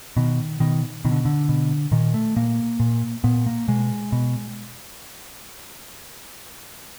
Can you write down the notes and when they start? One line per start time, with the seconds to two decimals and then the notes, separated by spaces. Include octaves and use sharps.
0.17 B2 D#3
0.60 B2 D#3
1.05 B2 D#3
1.12 D3
1.25 D3
1.49 B2
1.92 A#2 D#3
2.14 A3
2.36 A#2 A#3
2.80 A#2
3.24 A#2 B3
3.46 A#3
3.68 B2 G#3
4.12 B2